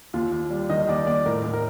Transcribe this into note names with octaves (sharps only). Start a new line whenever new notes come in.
D#2 F4
D#2
G3
D#3 D#5
D#2 D5
D#2 D5
A2 A#4
A2
A#4